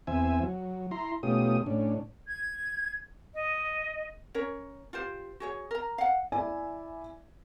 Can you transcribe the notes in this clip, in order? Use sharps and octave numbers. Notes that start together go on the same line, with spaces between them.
E2 C4 E5 G#5
F#3
E4 A#5 C6
B2 A3 C#4 F4 G4 D#6
A2 C#4 D4
G#6
D#5
C#4 A#4 C#5
F4 G4 C5
F#4 G#4 C#5
A#4 A#5
F5 F#5
E4 D5 E5 G#5